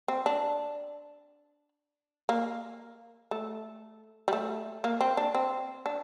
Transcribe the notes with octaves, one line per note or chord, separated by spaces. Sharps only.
C4
D4
A#3
A3
G3
A3
A#3
C4
D4
C4
D4